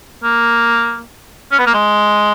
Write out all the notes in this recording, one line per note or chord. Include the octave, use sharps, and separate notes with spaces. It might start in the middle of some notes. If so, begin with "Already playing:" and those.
A#3
C#4
B3
A#3
G#3